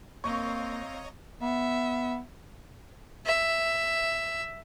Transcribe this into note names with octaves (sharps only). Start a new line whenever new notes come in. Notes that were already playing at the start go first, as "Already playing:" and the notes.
A#3 C4 C#5 D#5 F5 A#5 C#6
B3 E5
E5